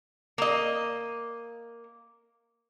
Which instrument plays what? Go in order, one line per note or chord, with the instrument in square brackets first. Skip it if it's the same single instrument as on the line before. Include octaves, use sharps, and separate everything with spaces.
[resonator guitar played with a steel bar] A#3 D#5